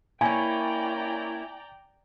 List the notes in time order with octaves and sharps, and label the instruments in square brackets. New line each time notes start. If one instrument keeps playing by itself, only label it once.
[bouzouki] A#3 C#4 [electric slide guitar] E4 [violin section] D5 G5 A#5 [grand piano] G#5